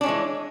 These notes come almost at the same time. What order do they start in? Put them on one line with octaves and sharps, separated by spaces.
D4 C#4 G#3 E3